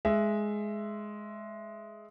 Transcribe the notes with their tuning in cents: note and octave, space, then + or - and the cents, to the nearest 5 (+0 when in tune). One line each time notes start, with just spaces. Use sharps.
G#3 +10 E5 +15